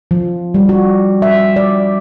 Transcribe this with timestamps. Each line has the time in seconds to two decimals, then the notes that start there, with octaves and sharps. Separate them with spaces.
0.11 F3
0.54 G3
0.69 F#4
1.22 E5
1.56 D5